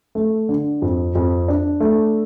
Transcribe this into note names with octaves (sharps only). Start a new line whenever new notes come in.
A3
D3
F2
F2
D4
A3